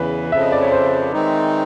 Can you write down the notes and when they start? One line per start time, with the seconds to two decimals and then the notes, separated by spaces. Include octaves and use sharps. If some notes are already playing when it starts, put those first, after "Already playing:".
Already playing: E2 C#3 E3 B4
0.30 F2 C#3 F3 E5
0.42 D#5
0.52 D5
0.62 C#5
0.72 C5
1.13 D#3 G#3 C4 D#4